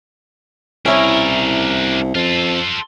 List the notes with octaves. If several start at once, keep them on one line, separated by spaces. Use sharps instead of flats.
C2 C#4 D4 E4 A#4 C#5
F2 F4 A4